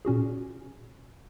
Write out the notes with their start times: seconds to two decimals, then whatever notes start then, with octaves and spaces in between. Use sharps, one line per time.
0.05 A#2 C#4 F#4 G#4